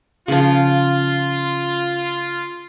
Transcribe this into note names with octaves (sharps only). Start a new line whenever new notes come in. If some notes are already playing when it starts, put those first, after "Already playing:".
C#3 F3 F4